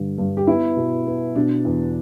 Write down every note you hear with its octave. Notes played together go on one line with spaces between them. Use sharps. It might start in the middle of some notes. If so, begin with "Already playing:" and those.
Already playing: G2 D3
G2
G4
B3 E4
B2
B3
B2 D4
E2